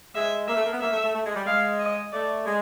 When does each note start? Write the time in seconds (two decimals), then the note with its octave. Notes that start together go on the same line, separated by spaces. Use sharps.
0.15 G#3 E5
0.48 A#3 E5
0.56 A3
0.64 A#3
0.72 B3
0.80 A#3 E5
0.92 A3
1.03 A3
1.14 A3
1.25 G#3
1.35 G3
1.46 G#3 F5
1.79 D#5
2.12 A3 D5
2.45 G#3